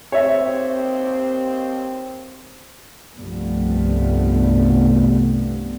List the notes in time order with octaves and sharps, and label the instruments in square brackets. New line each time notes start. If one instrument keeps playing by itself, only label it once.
[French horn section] D#2 C4 [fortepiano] C#5 E5
[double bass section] C2 G2 F3 G3 A3 B3